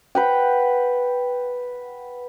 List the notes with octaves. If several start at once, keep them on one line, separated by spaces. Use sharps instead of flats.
B4 F#5 G5